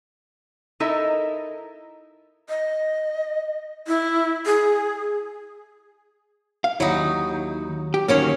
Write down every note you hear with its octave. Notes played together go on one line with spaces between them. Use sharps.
D#4 E4 A4 A#4 D#5 E5
D#5
E4
G#4
F5
D#2 F#3 D#4 E4
G4
D2 D#3 F#3 A#3 C#4 C#5